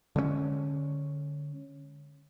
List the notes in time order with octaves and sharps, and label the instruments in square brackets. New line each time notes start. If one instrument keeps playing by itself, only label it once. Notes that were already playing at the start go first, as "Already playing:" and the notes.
[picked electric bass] D3 G#3 A#3 C#4